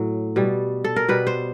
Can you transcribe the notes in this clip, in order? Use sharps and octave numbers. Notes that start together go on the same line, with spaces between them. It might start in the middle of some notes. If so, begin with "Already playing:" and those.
Already playing: A2 F#3
B2 G3
A4
A#4
B2 G3 B4
C5